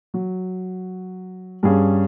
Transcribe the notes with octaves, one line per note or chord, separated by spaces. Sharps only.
F#3
G2 G3 C#4 G#4 F5